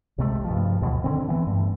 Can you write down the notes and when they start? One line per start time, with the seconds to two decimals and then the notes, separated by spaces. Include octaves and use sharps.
0.18 C2 C3 G#3 A3
0.44 G2 F3
0.82 D2 B2 D#3
1.04 D3 C4
1.28 E3 A#3 B3
1.47 G2 A3